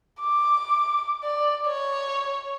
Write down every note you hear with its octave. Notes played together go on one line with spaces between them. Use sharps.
D6
D5
C#5